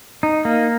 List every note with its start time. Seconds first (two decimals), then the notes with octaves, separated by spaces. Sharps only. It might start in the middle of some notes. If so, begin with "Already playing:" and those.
0.23 D#4
0.45 A#3